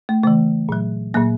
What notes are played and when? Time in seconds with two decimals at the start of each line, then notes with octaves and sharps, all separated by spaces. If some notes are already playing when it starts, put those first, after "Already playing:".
0.09 A3
0.23 C#3 E3 A3
0.69 A#2 F#3
1.14 A#2 F#3 A#3